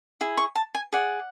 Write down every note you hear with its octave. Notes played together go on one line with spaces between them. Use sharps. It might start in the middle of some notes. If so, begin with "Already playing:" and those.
E4 G#4
C#6
A5
G#5
G#4 D5 F#5